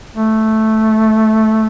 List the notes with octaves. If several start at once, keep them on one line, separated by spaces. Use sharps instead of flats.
A3